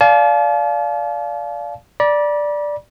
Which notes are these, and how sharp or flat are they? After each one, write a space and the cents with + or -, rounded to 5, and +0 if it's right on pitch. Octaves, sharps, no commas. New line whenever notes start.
D5 -15 F5 +0 A5 -45
D5 +0 B5 -45